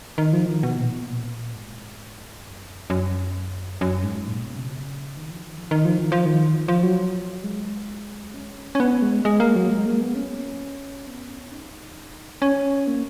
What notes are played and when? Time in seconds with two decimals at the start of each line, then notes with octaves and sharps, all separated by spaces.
0.18 D#3
0.33 F3
0.46 D#3
0.63 B2
0.78 A#2
0.92 B2
1.10 A#2
1.54 G#2
2.46 F#2
2.90 F#2
3.81 F#2
4.04 G#2
4.27 A#2
4.41 B2
4.57 C#3
5.17 D#3
5.31 F3
5.44 D#3
5.58 F3
5.71 D#3
5.85 F3
5.98 D#3
6.12 F3
6.26 D#3
6.68 F3
6.83 F#3
7.44 G#3
8.34 C#4
8.75 C#4
8.80 B3
9.02 G#3
9.25 G#3
9.40 A#3
9.56 F#3
9.70 G#3
9.86 A#3
10.01 B3
10.15 C#4
11.07 B3
11.29 C#4
11.51 D#4
12.42 C#4
12.87 A#3